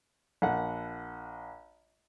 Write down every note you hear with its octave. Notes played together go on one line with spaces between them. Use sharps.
A#1 F#5